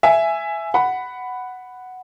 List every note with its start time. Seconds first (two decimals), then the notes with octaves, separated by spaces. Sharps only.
0.03 E5 G#5
0.74 F#5 B5